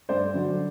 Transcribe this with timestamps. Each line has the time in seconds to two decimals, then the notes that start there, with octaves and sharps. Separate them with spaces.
0.09 G2 C5 D5
0.34 D3 F#3